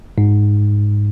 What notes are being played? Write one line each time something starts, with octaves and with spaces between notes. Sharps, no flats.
G#2